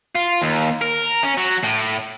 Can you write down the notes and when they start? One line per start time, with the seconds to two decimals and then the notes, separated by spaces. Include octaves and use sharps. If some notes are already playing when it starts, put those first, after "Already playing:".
0.15 F4
0.42 D#2
0.82 A#4
1.23 C#4
1.38 F#3
1.64 A2